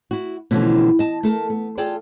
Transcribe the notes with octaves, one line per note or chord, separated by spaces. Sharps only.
E4 F#4
B2 D3 E3 F3 A3 C#4
D#5 A5
A3 A4 A#4
B3
F4 G#4 A4 D5 G5